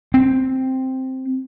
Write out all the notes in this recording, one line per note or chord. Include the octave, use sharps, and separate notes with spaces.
C4